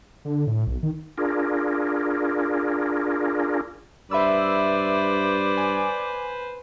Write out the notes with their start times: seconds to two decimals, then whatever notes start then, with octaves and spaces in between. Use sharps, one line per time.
0.25 D3
0.47 A2
0.67 B1
0.83 D#3
1.18 D4 F4 G#4 A#4
4.11 G2 B4 C5 D5 E5 B5 E6
5.57 G#5